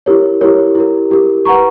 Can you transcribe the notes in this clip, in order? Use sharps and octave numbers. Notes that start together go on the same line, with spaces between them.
E4 G4 A#4 C#5
E4 G4 A#4 C#5
E4 G4 A#4
E4 G4 A#4
B4 F#5 A#5 C#6